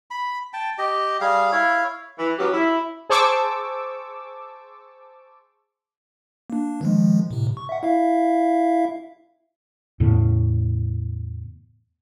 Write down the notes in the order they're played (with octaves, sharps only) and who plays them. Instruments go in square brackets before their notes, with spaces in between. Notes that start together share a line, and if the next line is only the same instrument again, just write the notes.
[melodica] B5
G5 A5
G4 D#5
G3 G#4 F5
E4 C#5 F5
[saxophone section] E3
F#3 B3 C#4 G4
E4
[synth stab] G#4 C5 A5 C#6 D6 E6
[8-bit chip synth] A#3 D4
D#3 F3 G#3
A2 C3
C#6
E5 F#5
E4 E5 F5
[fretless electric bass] E2 A2 C#3